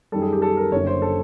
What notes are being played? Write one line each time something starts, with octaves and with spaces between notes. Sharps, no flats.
F#2 D#3 G3 A4
G#4
G4
A4
A#4
F#1 F#2 D3 C#5
C5
A4